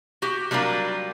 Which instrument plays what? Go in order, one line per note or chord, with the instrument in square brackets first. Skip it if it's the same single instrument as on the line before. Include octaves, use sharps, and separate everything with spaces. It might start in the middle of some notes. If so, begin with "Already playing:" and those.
[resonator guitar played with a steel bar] F#4 G4
F#3 G3 A#3 D4 F4